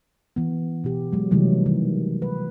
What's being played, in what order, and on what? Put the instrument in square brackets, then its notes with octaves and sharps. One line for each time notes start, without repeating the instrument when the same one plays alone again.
[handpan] E3 B3
B2 G4
F#3 G#3
C3 D#3 E3 F#3 G3 A3
D#3
B4